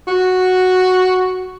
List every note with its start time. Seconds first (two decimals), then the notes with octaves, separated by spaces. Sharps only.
0.07 F#4